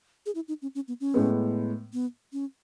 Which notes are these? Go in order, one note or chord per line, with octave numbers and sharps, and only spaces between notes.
G#4
E4
D#4
C#4
C#4
B3
C#4
A2 G#3 B3
B3
C#4